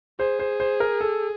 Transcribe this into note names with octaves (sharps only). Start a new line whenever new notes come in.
G#4 C5
C5
C5
A#4
A4